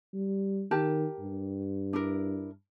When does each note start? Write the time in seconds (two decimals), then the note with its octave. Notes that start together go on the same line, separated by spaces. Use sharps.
0.14 G3
0.71 D#3 G4 A#4 A5
1.19 G2
1.93 D4 E4 A#4